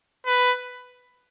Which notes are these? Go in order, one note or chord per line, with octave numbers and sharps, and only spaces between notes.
B4